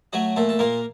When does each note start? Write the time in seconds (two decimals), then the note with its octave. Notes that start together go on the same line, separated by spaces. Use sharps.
0.13 F#3 A3 F#4
0.36 A#2 A3 A4
0.49 A4
0.59 A#2 A#3 A#4